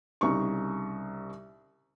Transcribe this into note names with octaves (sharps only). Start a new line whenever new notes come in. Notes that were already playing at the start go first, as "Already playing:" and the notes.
C2 C#3 D#4 C#6